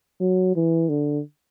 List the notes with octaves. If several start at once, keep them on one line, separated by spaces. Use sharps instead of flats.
F#3
E3
D3